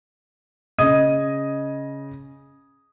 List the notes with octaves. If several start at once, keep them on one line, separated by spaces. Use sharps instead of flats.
C#3 D#5 D#6 G#6 D#7